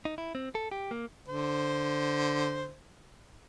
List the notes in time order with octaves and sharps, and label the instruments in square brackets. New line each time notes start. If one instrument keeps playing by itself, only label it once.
[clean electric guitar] D#4
E4
C4
A4
G4
A#3
[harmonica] D3 C5